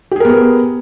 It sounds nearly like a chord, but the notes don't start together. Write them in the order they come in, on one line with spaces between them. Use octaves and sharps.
G4 G#4 A#4 B3